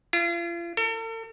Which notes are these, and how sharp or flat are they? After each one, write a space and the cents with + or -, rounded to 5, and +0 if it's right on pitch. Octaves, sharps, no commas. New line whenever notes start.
F4 -40
A4 +45